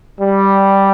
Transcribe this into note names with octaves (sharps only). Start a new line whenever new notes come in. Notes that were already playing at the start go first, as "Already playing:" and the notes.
G3